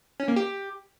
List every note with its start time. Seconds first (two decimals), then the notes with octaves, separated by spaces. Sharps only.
0.20 C#4
0.28 A#3
0.36 G4